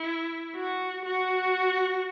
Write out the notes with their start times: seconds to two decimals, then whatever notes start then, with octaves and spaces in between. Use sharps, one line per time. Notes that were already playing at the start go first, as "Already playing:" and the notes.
Already playing: E4
0.55 F#4
1.05 F#4